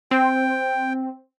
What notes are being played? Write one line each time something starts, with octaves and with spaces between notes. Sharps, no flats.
C4 G5